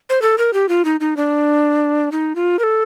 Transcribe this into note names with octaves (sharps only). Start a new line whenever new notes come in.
C5
A4
A#4
G4
F4
D#4
D#4
D4
D#4
F4
A#4
A4